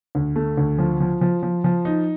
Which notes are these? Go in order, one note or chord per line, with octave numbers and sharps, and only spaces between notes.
D2
A3
D2
F3
F3
F3
F3
F3
D#4